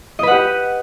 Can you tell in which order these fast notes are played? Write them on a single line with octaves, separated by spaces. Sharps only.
D#5 B4 F#5 G4